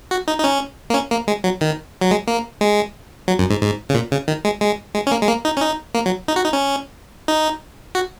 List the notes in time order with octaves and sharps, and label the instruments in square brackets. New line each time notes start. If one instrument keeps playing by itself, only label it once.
[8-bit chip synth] F#4
D#4
D#4
C#4
A#3
C#4
A#3
G#3
F#3
D#3
F#3
G#3
A#3
G#3
F#3
F#2
G#2
G#2
C#3
A#2
C#3
D#3
G#3
G#3
G#3
C#4
A#3
G#3
A#3
D#4
C#4
D#4
A#3
F#3
D#4
F#4
D#4
C#4
D#4
F#4